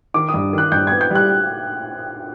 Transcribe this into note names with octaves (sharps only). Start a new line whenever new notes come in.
D#3 D6
D#6
G2
D#3 F#6
G2 G6
B3 G#6
G6
G3 F#6